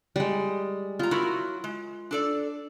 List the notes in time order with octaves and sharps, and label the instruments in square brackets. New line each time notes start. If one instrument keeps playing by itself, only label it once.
[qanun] G3 G#3
[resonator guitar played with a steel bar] B3 A#5 [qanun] F4
[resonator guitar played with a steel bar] F#3 E4 F#4 [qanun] A#4
[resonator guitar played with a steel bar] G#3
D4 A4 D5